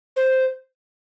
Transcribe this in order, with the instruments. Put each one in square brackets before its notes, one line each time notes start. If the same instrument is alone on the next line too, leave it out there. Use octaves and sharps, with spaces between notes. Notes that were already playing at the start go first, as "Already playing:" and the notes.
[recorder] C5